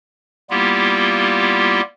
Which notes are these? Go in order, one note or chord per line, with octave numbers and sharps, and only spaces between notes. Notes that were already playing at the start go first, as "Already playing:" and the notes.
G3 A#3 B3 E4 F4 G4